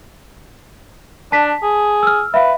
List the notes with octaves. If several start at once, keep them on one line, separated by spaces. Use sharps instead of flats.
D4 A5 B6
G#4
E6 F6
B4 E5 F5